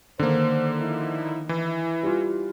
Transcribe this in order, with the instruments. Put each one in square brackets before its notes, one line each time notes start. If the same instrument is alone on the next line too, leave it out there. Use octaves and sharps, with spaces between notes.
[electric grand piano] D3 A#3 [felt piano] D#3 [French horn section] C5
[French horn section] F3 D#4 E4
[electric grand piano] E3 [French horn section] E4
[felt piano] G3 F4